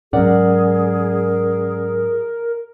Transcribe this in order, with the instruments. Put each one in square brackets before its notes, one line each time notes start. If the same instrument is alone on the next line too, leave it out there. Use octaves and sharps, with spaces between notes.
[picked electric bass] G#2 F#3 [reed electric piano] C#4 D5 F#5 [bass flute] G#4 [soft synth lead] A#4